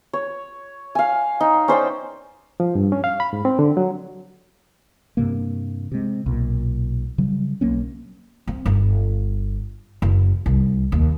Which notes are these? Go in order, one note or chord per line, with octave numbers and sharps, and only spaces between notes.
C#5
F5 G#5
D#4
C#4 C5 D5 G5
F3
G2
C#4
F5
B5
G#2
C4
D3
F#3
G2 C3 A#3
C3 G#3
B1 A#2
C#3 F#3 G3
B1 F#3 A#3 C#4
C4
G1
F#1
C2
D#2